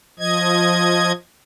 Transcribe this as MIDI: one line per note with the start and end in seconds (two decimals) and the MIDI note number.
0.19 1.12 53
0.19 1.12 75
0.19 1.12 92